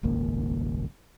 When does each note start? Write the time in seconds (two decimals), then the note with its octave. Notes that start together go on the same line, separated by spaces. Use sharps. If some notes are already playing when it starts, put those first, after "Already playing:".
0.03 D#1 G#1 C#2 A#3